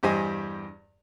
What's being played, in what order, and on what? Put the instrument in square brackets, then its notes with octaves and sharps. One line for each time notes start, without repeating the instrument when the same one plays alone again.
[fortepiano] E2 G2 G4 C5 D#5 G#5